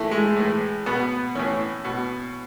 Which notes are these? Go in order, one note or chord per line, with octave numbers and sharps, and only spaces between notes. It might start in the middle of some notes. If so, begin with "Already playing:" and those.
Already playing: A2 E3 A3
G#3
A2 E3
B2 B3
A2 E3 C#4
B2